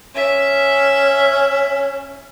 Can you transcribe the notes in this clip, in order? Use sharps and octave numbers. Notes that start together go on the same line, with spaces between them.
C#4 E5